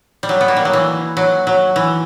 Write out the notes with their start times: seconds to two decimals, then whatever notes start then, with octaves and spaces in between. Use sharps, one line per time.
0.23 G3
0.29 F#3
0.41 B3
0.48 A#3
0.57 G3
0.65 F#3
0.73 E3
1.17 F#3
1.47 F#3
1.76 E3